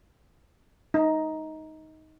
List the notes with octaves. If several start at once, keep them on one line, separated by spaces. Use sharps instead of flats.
D#4